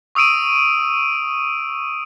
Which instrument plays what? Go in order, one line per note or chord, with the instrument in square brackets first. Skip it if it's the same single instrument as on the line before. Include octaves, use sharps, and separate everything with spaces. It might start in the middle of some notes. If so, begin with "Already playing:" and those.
[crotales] C#6 D#6 E6 D7 D#7